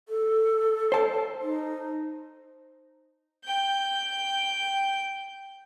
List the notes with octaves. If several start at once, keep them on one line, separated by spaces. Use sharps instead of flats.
A4
C5 A5
D#4
G5 G6